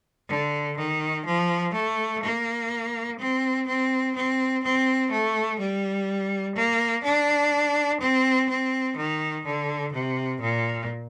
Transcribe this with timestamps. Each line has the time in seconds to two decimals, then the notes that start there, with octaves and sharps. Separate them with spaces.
0.29 D3
0.78 D#3
1.25 F3
1.74 A3
2.23 A#3
3.19 C4
3.67 C4
4.15 C4
4.63 C4
5.11 A3
5.60 G3
6.55 A#3
7.04 D4
8.01 C4
8.49 C4
8.96 D#3
9.45 D3
9.93 C3
10.41 A#2